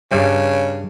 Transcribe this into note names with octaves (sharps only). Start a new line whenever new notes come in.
G2 C#3 G3